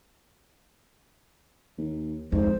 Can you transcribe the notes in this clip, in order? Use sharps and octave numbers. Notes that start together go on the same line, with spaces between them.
D#2
F2 G#2 C5